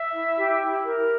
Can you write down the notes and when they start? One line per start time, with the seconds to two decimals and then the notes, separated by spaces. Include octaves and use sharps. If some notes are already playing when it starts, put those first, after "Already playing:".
Already playing: E5
0.11 E4
0.36 G4
0.60 E4
0.85 A#4